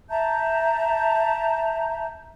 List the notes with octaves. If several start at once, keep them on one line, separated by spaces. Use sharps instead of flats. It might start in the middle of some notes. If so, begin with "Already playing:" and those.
E5 A5 A#5 G6